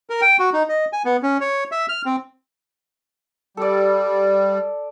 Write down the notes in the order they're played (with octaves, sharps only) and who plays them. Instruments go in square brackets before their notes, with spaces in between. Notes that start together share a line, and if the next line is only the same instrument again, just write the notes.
[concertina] A#4
G5
F#4
D#4
D#5
G#5
B3
C#4
C#5
E5
F6
C4
[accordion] G3 [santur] A4 D5